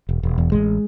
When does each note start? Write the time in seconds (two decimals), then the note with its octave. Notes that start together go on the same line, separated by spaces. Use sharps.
0.09 E1
0.23 E1
0.38 E2
0.52 A1 G#3